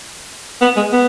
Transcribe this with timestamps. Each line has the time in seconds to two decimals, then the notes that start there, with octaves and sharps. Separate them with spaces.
0.62 B3
0.77 G#3
0.93 B3